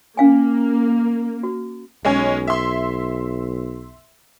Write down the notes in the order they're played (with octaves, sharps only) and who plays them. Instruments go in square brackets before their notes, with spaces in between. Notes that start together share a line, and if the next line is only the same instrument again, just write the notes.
[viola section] A#3 [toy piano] C#4 F5 G#5
[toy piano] F#4
[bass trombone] B1 [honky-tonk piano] G#3 C#4 G#5
[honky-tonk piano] E5 C6